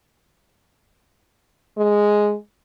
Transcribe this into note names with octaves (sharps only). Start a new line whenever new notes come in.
G#3